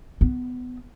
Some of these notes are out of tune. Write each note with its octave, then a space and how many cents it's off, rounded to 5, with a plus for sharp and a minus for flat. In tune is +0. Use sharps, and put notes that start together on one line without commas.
B3 +15